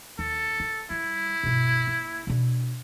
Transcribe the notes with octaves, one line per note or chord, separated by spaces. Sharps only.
D#2 A4
E4
G3 E4
G1 B2
A#3
B2 D4